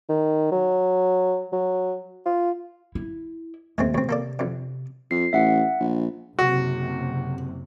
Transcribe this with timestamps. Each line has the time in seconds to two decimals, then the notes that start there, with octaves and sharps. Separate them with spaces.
0.09 D#3
0.52 F#3
1.53 F#3
2.26 F4
2.95 E4
3.78 D#2 G#3 A3 C4
3.94 A2 C3 C4
4.09 A#3 A4 D5
4.39 F2 D3
5.11 F2 C7
5.33 A1 E5 F#5
5.80 A#1
6.39 F#1 C3 F#4